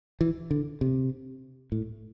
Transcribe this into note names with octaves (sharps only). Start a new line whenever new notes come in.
E3
D3
C3
A2